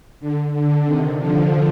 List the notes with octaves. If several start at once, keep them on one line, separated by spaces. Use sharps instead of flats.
D3
D3
C3 D#3
D3 F3